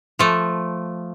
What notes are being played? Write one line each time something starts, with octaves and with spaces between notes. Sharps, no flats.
F3 A3